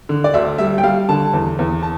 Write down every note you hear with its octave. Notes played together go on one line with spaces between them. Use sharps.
D3
D5
D2 E5
G3 E5
G5
G3 F5
D3 A5
E2
E2
A5